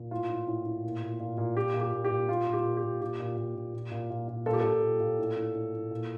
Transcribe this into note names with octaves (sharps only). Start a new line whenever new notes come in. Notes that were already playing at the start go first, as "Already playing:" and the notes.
Already playing: A#2
A2 F4
A2
A2
A2
A#2
A#2
A#2
A#2
A#2 G4
A#2
G4
A#2
G4
A#2
A#2 F4
A#2
G4
A#2
G4
A#2
A#2 G4
A#2
A#2
A#2
A#2
A#2
A#2
A#2
A#2 A4
G4
A#2 A4
A#2
A#2
A2
A2
A2
A2
A#2